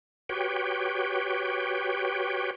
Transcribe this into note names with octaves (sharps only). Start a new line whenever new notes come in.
F#4 G4 B4 C#5 G5